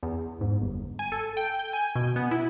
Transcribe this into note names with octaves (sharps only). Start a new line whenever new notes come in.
E2
G#2
G1
G#5
A4
G5
G6
G#5
B2
B3
E4